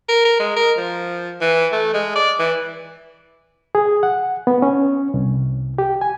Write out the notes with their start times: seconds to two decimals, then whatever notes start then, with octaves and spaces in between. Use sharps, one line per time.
0.09 A#4
0.25 A#4
0.40 G#3
0.57 A#4
0.78 F3
1.41 E3
1.73 A3
1.94 G#3
2.16 D5
2.40 E3
3.75 G#4
4.03 F#5
4.47 B3
4.62 C#4
5.14 C2
5.78 G4
6.01 G#5